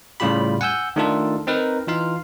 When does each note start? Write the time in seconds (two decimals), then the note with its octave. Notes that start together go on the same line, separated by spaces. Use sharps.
0.20 A2 C#3 G3 F4 G4 B5
0.61 F#5 G#5 E6 G6
0.96 D#3 A3 D4 D#4 F4 A4
1.47 C4 D#4 A#4 B4
1.87 E3 D#4 F4 F5